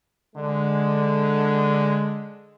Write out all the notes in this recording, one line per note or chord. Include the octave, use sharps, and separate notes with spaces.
D3 G#3